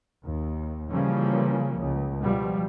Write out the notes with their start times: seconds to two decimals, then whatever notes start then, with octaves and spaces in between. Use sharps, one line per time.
0.24 D#2
0.90 C#3 E3 F3 G3 A#3 C#4
1.78 C#2
2.21 B2 F3 G3